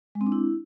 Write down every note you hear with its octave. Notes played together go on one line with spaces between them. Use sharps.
G#3
C4
D4
E4